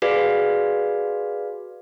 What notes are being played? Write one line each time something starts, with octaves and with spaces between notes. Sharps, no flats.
F#4 G#4 B4 D5 F5